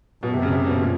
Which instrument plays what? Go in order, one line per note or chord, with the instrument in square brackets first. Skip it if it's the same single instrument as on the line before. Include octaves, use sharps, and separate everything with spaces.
[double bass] F#2 [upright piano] B2
[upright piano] C3
C#3
C3
B2
A#2